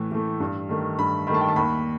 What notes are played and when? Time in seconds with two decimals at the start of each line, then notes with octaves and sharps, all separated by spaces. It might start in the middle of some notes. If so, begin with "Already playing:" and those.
Already playing: A2 E3 A3
0.11 E3 A3
0.40 G2
0.69 D#3 A3
0.98 G2 B5
1.27 D#3 B5
1.31 A3 A5
1.41 G5
1.48 A5
1.56 D#2 B5